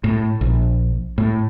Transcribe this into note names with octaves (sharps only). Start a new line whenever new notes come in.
A2
A#1
A2